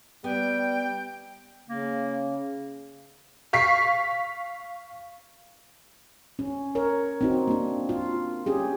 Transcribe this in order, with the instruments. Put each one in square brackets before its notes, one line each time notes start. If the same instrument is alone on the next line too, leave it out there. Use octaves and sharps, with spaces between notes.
[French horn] G3 [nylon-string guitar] B3 [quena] G5
[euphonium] C#3 [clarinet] A#3
[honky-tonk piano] F5 C#6 B6 C7
[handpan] C#4
A#4 C#5
C4 D#4 F#4
A#3 D4
F4
C#4 G4 G#4